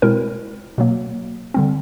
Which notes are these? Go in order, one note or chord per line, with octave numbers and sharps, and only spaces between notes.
B2 G#3 C4 E4 A#4
B2 F#3 A#3
D3 G3 C4